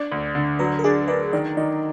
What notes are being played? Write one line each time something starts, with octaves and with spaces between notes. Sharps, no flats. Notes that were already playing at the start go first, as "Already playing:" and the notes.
Already playing: D4 D5
D2
D3
F#3 B4
A#4
D4 G#4
D4 B4
D#3 D5
D#3 D#5